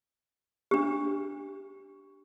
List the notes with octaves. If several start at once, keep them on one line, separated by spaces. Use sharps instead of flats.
D4 G4